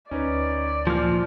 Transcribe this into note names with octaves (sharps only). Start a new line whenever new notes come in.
D2 C#4 D#4 B4 D5
A#2 F3 F6